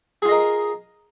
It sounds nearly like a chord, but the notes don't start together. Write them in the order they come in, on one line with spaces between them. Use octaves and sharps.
G#4 F4 D#5 A#4